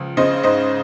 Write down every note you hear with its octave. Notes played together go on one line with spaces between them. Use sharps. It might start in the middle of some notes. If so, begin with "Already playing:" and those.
Already playing: C#2 F3
C#3 C5 D#5
G#2 C5 D#5